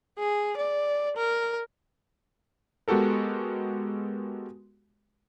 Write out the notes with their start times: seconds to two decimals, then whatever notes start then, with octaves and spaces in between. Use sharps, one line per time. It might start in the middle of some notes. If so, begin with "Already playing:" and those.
0.19 G#4
0.57 D5
1.17 A#4
2.88 G#3 B3 F#4 G4 A4 A#4